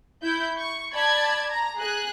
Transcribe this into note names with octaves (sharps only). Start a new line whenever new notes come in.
E4 G6
C#6
D5 A5 B5 G#6
A#5
G#4 F#6